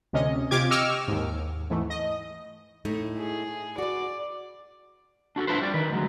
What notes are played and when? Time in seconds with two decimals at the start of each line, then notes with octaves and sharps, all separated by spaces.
0.13 D2 C3 C#4 D#5
0.51 C3 F4 G4 D6 G#6
0.70 D#5 G5 C#6 D6 E6 F6
1.08 D#2 G#2
1.70 G#2 E3 A3
1.90 D#5
2.85 A2 A3 D#4
3.19 G#4
3.78 F#4 B4 D5
5.36 D4 F#4 G4 A4
5.47 D4 E4 F4 B4 C5
5.61 G3 D5
5.74 D#3 B4
5.91 D2 F#3 G#3